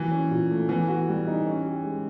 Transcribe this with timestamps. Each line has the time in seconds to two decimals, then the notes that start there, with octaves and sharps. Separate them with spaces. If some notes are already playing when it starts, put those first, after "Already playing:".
Already playing: E3 F#3 A#3
0.11 C#4
0.31 A#2
0.51 A3
0.69 E3 B3
0.88 F#4
1.08 G3
1.27 D#4
1.46 C#4
1.65 G4
1.84 G#3